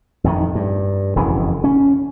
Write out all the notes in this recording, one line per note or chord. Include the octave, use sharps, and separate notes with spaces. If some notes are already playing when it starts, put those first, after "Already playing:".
F2 A2 D#3
G2
E1 F2 C#3 E3
C#4